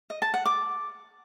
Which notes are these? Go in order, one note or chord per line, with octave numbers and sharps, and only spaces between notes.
D#5
A5
F#5
D6